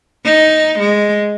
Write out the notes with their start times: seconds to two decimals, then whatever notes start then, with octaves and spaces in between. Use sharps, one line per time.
0.25 D#4
0.79 G#3